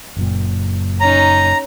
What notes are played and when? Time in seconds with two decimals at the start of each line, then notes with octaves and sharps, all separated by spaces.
0.17 F#1 F#2 A#2
1.00 C#4 D#4 A#5